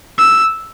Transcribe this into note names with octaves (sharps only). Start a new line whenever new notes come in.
E6